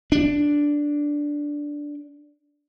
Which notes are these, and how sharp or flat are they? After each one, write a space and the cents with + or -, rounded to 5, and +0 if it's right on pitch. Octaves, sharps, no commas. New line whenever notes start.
D4 -5